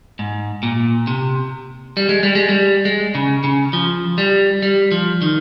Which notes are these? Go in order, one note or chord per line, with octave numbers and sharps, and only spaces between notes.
G#2
A#2
C3
G3
G#3
G3
G#3
G3
G#3
C#3
C#3
F3
G3
G3
F3
D#3